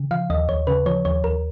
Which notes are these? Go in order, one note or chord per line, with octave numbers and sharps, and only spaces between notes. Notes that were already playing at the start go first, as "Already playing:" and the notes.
Already playing: C#3
F3 F5
D#2 D#5
D#2 C#5
C#3 B4
F3 C#5
D#2 C#5
D#2 A#4